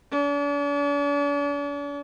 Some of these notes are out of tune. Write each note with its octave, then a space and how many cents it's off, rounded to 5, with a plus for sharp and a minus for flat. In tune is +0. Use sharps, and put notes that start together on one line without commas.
D4 -45